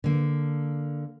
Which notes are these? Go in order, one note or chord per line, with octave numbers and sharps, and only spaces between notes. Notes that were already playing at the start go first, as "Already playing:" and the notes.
D3 A#3